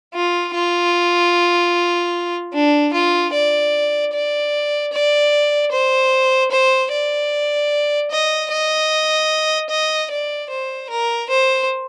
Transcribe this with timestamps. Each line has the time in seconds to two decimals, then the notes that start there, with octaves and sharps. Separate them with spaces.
0.14 F4
0.55 F4
2.54 D4
2.93 F4
3.33 D5
4.13 D5
4.93 D5
5.72 C5
6.51 C5
6.92 D5
8.11 D#5
8.51 D#5
9.70 D#5
10.11 D5
10.49 C5
10.90 A#4
11.30 C5